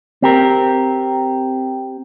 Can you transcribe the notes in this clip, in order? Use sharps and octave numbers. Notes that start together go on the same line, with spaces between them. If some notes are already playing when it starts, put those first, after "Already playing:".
C4 G4 A#4